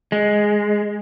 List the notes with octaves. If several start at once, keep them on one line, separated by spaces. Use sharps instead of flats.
G#3